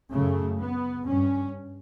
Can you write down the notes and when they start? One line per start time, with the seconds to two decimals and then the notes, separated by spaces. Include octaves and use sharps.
0.12 F#2 C#3 A3
0.59 B3
1.05 G2 C#4